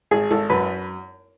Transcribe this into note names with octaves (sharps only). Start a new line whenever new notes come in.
G#1 G#4
G#1 A4
F#2 B4